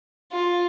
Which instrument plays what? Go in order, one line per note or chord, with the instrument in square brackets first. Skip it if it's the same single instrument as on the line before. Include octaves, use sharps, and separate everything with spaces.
[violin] F4